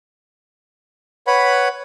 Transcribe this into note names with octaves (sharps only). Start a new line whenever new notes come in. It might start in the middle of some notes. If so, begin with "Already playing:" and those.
B4 C#5 F#5 B5